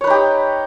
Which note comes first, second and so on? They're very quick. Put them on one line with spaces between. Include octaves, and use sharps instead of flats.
C#5 B4 D#4 G4